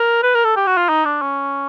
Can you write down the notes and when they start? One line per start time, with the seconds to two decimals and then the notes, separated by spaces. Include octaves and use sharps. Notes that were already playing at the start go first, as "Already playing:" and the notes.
Already playing: A#4
0.23 B4
0.35 A#4
0.45 A4
0.56 G4
0.67 F#4
0.77 F4
0.89 D#4
1.05 D4
1.22 C#4